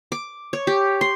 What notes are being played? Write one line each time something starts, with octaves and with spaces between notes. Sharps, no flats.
D6
C#5
G4
C6